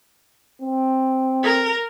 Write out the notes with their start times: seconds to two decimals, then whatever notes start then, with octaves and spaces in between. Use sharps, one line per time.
0.62 C4
1.44 A#4